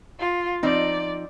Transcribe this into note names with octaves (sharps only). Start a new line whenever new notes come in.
F4
F3 C4 D#4 D5